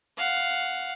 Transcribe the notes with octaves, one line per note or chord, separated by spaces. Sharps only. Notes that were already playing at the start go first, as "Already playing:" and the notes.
F5 F#5